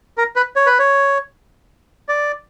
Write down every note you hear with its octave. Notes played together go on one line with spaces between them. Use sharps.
A#4
B4
C#5
B4
C#5
D5